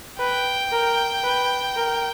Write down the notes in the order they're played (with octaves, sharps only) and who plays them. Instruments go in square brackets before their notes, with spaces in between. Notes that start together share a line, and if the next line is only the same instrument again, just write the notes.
[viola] B4 [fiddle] G5
[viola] A#4
B4
A#4